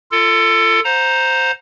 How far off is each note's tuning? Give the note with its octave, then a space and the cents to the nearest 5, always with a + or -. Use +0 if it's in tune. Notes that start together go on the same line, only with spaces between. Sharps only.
F4 -25 A4 +20
C5 +0 F#5 -40 A#5 +0